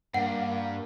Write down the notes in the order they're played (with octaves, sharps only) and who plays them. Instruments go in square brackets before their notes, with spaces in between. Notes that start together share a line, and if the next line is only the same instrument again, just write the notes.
[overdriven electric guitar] G2 [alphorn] A#3 [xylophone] F#5